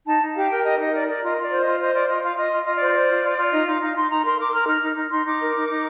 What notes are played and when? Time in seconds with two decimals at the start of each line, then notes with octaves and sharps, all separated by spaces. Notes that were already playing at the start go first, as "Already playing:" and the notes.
0.07 D#4 A5
0.21 D#4
0.35 G4 F5
0.49 A#4 G5
0.64 G4 D#5
0.79 D#4 D#5
0.93 A#4 D5
1.07 A#4 D5
1.21 F4 D#5
1.37 F4 D5
1.51 C5
1.61 F4 D#5
1.80 C5 D#5
1.93 F4 D5
2.08 F4 D#5
2.23 F4 F5
2.37 F4 D#5
2.52 F4
2.65 F4 D#5
2.75 D5
2.80 C5
2.94 C5
3.09 F4
3.24 F4
3.38 F4
3.52 D#4 D#5
3.67 D#4 F5
3.81 D#4 F5
3.95 D#4 C6
4.10 D#4 A#5
4.25 A#4 C6
4.38 A#4 D6
4.53 A#4 F6
4.67 D#4 F6
4.82 D#4
4.96 D#4
5.10 D#4 C6
5.25 D#4 D6
5.40 A#4
5.54 D#4
5.69 D#4